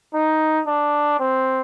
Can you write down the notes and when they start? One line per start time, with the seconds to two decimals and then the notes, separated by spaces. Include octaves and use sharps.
0.14 D#4
0.67 D4
1.19 C4